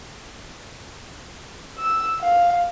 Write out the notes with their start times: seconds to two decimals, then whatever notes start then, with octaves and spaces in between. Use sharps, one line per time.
1.78 E6
2.21 F5